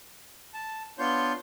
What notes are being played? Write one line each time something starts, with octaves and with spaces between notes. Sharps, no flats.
A5
B3 D4 F4 C#5 C6 G6